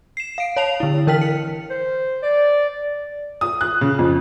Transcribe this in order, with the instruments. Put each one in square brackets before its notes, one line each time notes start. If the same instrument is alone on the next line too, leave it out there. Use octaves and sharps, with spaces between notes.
[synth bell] C7 E7
F5 D7
C#5 F5 A5 F7
D3 E4
E3 A#4 G5 F6 B6 F#7
C#7
[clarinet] C5
D5
[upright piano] D#6
F#6
C#3
F2